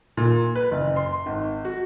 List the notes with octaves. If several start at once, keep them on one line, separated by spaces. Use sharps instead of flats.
A#2
B4
F#1
C6
G#1
F#4